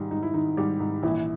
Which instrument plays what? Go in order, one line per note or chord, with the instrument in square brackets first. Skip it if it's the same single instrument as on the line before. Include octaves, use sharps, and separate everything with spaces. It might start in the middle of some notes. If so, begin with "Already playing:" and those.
Already playing: [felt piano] G#2 D#3 G3 D#4
G#2 D#4
E4
D#3 D#4
G#2 G3 G4
G#2
A#1 E3 E4